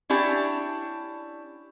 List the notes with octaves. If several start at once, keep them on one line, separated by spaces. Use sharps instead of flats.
C#4 D4 E4 G4 D5